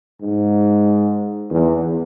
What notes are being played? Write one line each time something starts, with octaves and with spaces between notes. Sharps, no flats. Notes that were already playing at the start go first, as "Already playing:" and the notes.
G#2
E2